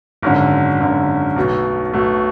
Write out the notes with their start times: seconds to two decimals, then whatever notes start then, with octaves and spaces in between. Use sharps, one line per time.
0.22 G#1 F#2 D3
0.80 G#1 F#2 D3
1.36 B1 B2 A3
1.93 B1 B2 A3